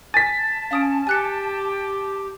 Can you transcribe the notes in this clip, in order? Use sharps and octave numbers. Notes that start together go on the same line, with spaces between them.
G#5 A5 A6 B6
C#4 F5 D#6 D7
G4 G#5 F#6 C#7